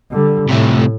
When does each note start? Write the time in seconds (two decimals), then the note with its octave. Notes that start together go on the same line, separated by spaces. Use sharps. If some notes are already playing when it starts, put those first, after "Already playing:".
0.11 D3 G3
0.49 A2 C3 A3